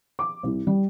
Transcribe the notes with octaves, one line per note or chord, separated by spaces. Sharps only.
D6
C2
G3